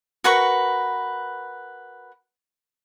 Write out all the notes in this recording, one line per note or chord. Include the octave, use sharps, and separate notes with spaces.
F#4 A#4 B4 C#6